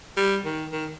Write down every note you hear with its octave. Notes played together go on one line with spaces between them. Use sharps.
G3
D#3
D#3